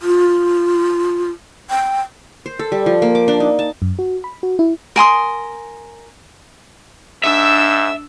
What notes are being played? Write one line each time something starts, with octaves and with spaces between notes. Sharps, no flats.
F4
G5
C5
A4
G3
F3
A#3
D6
D4
D#4
A5
F#2
F#4
B5
F#4
E4
A#4 G#5 C6 D#6
G#2 D4 E5 E6